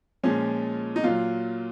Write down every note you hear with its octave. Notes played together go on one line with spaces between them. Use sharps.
A#2 F3 G#3 C#4
D#4
A#2 F#3 F4